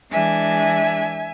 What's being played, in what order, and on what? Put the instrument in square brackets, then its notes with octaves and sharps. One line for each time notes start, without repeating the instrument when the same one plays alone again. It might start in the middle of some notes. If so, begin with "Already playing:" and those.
[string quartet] E3 G#3 D4 E5 G#5